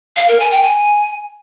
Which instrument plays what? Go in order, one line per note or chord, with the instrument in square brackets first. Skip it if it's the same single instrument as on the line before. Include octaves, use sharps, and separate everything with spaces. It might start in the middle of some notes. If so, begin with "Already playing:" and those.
[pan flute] F5
A#4
G#5
G5
G#5